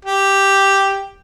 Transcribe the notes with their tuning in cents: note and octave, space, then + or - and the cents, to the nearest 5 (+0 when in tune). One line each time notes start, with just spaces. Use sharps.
G4 +0